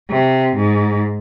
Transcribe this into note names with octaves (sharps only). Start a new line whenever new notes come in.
C3
G#2